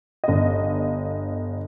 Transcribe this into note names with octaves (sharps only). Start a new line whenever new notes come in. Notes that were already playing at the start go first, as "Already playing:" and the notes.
G1 D#5